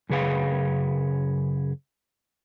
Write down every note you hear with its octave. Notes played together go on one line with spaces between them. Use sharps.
F#2 C#3 G#4 B4 F5